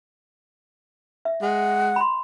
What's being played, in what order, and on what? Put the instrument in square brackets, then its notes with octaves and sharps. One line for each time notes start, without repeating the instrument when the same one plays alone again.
[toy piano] E5
[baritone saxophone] G#3 [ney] F#5
[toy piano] B5 C6